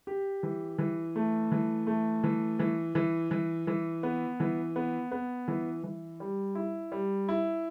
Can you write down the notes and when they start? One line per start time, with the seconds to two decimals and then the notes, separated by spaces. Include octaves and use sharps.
0.07 G4
0.43 E3
0.79 E3
1.16 A3
1.52 E3
1.87 A3
2.24 E3
2.59 E3
2.95 E3
3.31 E3
3.67 E3
4.03 B3
4.40 E3
4.76 B3
5.11 B3
5.48 E3
5.84 E3
6.20 G3
6.55 E4
6.92 G3
7.29 E4